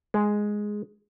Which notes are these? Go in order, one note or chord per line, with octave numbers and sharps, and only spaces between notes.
G#3